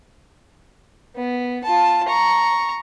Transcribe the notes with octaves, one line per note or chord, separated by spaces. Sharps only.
B3
F4 A5
A#5 C#6